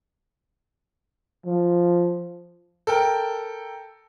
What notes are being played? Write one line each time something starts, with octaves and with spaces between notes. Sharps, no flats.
F3
A4 A#4 G5